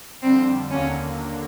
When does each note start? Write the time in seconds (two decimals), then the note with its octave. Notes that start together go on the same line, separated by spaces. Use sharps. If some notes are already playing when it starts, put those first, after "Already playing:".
0.22 F2 D3 G3 C4
0.70 D#2 D3 F#3 A#3 C#4